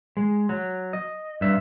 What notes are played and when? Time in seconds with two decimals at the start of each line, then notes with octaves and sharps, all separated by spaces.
0.17 G#3
0.49 F#3
0.93 D#5
1.41 G2 E5